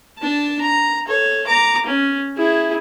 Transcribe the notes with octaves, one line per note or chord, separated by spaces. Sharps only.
D4 A5
A#5
A4 C#5
A#5 D6
C#4
E4 G#4